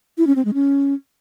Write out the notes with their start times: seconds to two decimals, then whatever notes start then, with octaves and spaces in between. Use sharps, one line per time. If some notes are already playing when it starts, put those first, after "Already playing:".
0.18 E4
0.27 C#4
0.36 C4
0.45 G#3
0.54 C#4